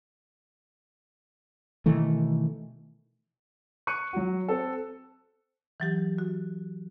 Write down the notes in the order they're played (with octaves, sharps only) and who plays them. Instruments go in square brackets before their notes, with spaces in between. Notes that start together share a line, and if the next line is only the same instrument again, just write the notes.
[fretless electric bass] B2 D#3 E3 A3
[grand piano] C#6 F#6 C#7 D#7
F#3 F#4
C4 A4
[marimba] E3 F#3 G4
F#4